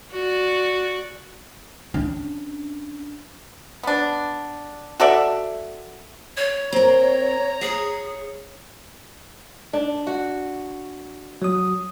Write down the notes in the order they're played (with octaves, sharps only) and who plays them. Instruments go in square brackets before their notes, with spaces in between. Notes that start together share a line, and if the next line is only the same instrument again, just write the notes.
[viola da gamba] F#4 D5
[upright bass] C#4 D4
[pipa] B3 D4
F#4 A4 D5 E5
[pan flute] C#5
[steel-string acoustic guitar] C4 A#4 [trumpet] A#5
[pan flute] G#4 [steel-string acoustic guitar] C#5
[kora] D4
F#4
[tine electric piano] F#3 D#6